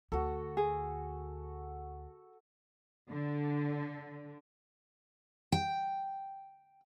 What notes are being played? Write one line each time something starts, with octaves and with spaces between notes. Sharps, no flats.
D2 F#4 A4
G#4
D3
G5